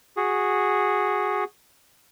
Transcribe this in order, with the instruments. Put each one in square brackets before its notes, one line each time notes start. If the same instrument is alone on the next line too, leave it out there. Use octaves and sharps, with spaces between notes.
[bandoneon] F#4 G#4